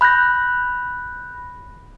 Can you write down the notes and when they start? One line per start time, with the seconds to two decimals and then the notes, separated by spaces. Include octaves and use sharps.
0.01 B5 F#6 G6 A#6